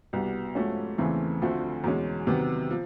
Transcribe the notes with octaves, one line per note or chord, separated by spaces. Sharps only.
C2 B2 G3 B3
G#2 F3 A3 C#4 F#4
E2 C#3 E3 A3 C4
D2 D3 F3 A3 C4
E2 B2 G#3 C#4
C3 D#3 F#3 B3
F3